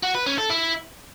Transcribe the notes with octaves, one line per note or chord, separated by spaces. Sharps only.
F#4
B4
C#4
A4
E4